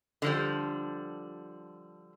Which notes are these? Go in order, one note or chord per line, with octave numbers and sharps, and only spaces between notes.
D3 F3 G3